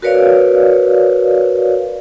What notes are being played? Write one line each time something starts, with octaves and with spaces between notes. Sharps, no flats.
F#4 A#4 B4 C#5 D5 F5